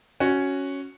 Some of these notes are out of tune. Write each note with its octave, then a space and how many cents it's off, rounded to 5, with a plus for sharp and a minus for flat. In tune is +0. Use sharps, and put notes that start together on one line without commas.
C#4 +0 F#4 +0